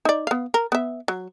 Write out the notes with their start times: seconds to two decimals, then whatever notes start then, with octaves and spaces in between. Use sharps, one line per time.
0.05 D#4 D5
0.27 B3 F5
0.54 A#4
0.72 B3 E5
1.08 F#3